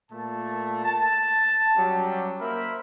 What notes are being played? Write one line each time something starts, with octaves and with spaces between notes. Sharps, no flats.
A#2 A3 A5
A5
F#3 G3 C#4 G4
A#3 A#4 C5 E5 B5